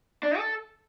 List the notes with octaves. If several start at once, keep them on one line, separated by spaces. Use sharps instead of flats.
D4
A4